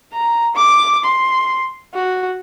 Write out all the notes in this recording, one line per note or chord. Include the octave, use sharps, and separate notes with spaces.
A#5
D6
C6
F#4